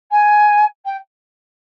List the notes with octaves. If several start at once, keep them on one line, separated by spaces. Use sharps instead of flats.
G#5
G5